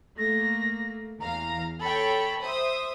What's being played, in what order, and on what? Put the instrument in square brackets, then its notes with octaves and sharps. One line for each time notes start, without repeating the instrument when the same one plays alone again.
[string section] A3 A#3 [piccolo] A#6
[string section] E2 F5 [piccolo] A#5
[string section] A4 C#5 G5 [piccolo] B5
[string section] C5 E5 D#6